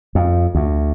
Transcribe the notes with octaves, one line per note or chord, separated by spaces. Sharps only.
F2
D2